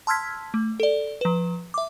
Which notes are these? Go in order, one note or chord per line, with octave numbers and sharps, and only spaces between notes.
A5 C6 E6 F6 G#6 B6
A3
A4 D5
F3 B4
E5 D6